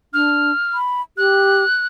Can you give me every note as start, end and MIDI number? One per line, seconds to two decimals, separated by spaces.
0.14 0.51 62
0.14 0.77 89
0.74 1.02 83
1.18 1.64 67
1.18 1.86 90